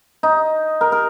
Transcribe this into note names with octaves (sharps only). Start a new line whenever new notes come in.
D#4
A#4
A#4